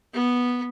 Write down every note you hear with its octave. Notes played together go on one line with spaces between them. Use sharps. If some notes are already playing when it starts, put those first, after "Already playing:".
B3